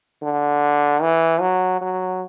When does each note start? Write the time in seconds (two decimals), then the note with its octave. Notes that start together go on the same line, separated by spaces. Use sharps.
0.23 D3
1.02 E3
1.41 F#3
1.81 F#3